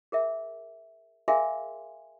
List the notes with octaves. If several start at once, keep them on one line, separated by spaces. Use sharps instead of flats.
G#4 A#4 E5
G#4 A#4 E5 F5 G#5 C6